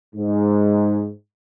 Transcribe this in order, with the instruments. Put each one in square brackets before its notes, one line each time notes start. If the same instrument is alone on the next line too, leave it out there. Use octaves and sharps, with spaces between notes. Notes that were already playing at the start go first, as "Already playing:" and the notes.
[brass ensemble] G#2